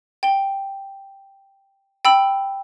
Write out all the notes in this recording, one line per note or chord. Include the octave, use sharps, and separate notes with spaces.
G5 G7
G5 B5 E6 F#7